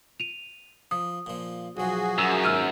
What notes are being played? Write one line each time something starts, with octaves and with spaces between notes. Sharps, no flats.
D#7 F7
F3 D#6
A#2 F3
B1 F3 F#4 G#4
F#2 E6
D#2 G#2 E6 F6 D#7